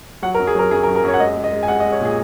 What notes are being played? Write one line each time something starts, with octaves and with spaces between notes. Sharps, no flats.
F#3 F#5
A#4
F#2
G#4
F#3 A#4
F#2 G#4
A#4
F#2
A#4
F#2 C#5
F#5
G#3 D#5
G#3
D#5
G#3
G#5
G#3 F#5
D#5
G#3
C#5
A#2 G#4